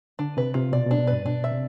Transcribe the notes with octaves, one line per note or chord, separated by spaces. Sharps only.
D3 D4
C3 B4
C3 F4
B2 D5
B2
D4
B2
G2 B4
B2 D4
E5
C3